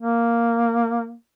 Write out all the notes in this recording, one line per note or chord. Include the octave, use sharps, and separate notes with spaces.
A#3